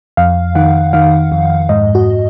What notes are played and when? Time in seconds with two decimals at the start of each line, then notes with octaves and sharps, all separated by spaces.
0.17 F2 F5
0.55 D#3 F#5
0.93 D#3 F5
1.32 F2
1.69 G#2 D#5
1.95 F#4